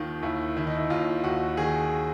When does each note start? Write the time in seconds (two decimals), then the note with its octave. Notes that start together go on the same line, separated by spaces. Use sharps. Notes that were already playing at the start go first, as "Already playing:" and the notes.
Already playing: D#2 D#3 F4
0.23 D#2 E4
0.56 D#3 E4
0.67 D#4
0.77 E4
0.90 D#2 F4
1.24 D#2 F#4
1.57 D#3 G#4